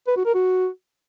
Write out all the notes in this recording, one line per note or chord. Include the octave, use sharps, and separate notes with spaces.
B4
F#4
A#4
F#4